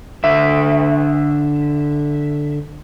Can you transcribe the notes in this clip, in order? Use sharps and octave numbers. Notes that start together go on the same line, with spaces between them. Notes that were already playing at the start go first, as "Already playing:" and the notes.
D3 E5